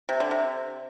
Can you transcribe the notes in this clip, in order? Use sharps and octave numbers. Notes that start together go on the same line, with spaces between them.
C3
D3
C3